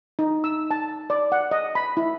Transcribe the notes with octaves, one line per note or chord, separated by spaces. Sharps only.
D#4
E6
A5
D5
F#5
D#5
B5
E4